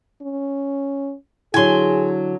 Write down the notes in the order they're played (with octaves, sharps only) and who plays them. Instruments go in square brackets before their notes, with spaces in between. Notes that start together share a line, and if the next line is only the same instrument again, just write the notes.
[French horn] C#4
[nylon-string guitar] D3 F#3 [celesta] E4 [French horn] G#4 [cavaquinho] G#5 C6